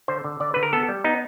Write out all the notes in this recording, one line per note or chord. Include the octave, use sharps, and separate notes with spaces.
D3 C5
D3
D3 D5
D3 B4
A#4
B3 A4
G3
B3 D#4